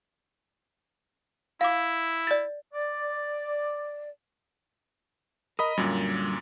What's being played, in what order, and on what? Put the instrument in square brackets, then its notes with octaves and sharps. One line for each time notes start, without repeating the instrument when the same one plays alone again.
[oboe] E4 [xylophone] F5 D6
[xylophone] D5 A6
[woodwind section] D5
[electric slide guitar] A#4 [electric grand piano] D#5 B5 D#6
[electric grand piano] F#2 A#2 [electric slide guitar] D3 G3